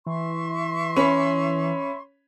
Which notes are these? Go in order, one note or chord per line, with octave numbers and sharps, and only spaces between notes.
E3 E5 C6 C#6
C#4 B5